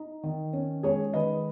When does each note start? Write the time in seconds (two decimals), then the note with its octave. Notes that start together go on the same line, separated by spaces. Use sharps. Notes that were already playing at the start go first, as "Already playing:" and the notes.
Already playing: D#4
0.23 D#3
0.53 C#4
0.83 G#3 G#4 C#5
1.14 D#3 B4 D#5